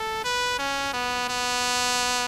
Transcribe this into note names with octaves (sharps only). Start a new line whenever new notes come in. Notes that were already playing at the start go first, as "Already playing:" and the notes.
Already playing: A4
B4
C#4
B3
B3